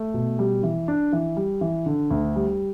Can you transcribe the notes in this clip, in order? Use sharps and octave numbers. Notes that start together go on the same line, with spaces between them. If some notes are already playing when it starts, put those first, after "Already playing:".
Already playing: A3
B2
G3
E3
D4
E3
G3
E3
D3
D2
G3